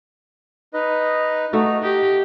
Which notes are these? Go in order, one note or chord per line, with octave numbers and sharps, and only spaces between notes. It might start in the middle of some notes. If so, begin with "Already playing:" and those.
D#4 B4 D#5
A3 D#4 F#4
G4 D#5